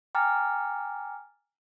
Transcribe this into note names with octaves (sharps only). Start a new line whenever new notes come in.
G5 G#5 A#5 D6 F6 A6